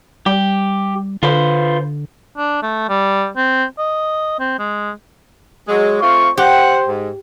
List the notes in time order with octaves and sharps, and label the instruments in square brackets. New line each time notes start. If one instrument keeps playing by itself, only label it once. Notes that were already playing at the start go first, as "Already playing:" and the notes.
[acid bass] G3 [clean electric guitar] G4
[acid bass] D3 [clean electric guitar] F4 B4 C5
[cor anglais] D4
A3
G3
C4
D#5
C4
G#3
[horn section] F#3 G#3
[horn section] A3 C4 F4 [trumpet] C#6
[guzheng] G4 [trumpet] C5 [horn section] F#5
[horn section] G#2